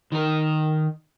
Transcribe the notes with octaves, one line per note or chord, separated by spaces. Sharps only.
D#3 A#4